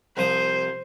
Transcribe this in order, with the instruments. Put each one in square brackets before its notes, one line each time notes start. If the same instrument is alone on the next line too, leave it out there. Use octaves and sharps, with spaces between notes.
[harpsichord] C2 F3 D#6 [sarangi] C5